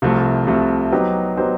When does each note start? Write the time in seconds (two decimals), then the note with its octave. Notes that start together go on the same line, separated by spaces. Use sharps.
0.02 C2 C3 F3 A3
0.47 C2 C3 F3 A3
0.92 F#3 B3 D#4 G4 C5
1.37 F#3 B3 D#4 G4 C5